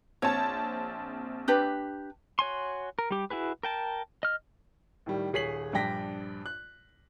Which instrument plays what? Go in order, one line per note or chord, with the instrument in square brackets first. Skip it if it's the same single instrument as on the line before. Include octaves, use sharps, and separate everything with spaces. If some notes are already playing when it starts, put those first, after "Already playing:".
[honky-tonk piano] A#1 C4 A5 [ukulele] C#5
[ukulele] D4 G4 B4
[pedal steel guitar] F#4 C#5 G#5 C6
A#4
G3 G4
E4 F#4 G#4 B4
A#4 G5 A5
D#5 F6
[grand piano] A2 D#3 G3
D#1 G#4 C#5 B6 C7 F#7
A#1 G2 D4 G5 A#6 B6
F#6